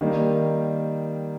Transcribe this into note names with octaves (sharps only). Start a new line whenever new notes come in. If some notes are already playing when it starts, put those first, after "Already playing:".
D#3 G3 A#3